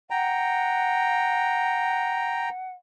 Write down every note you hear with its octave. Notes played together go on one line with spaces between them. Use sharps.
F#5 G5 A#5